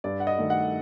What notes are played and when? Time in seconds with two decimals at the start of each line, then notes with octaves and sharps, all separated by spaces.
0.04 G2 D5
0.20 F#5
0.27 D#5
0.39 D#3 A3
0.50 F#5